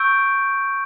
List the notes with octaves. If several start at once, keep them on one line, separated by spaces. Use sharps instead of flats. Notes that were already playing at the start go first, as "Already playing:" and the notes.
Already playing: C#6 E6 G6 D7